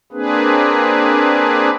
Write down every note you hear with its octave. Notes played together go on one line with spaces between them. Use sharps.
A#3 C4 D4 G#4 B4